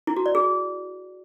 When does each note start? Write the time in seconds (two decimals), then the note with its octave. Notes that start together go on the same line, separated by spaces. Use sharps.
0.07 E4
0.17 F#4
0.26 D5
0.35 G#4